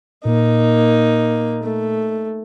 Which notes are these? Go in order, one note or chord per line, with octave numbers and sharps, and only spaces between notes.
A#2 A#3 D#4
A3